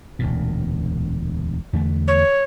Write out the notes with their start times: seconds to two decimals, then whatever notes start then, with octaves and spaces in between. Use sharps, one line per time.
0.19 E1 D2 A#2
1.73 E2 D3 A3
2.08 C#5